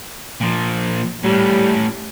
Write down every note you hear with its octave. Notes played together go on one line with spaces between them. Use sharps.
A#2 F3
A2 G3 C#4